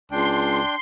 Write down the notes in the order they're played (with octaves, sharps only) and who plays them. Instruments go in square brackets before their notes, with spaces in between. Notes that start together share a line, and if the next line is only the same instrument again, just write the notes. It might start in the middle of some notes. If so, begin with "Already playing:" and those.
[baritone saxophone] C#2 [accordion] D4 G5 [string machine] C6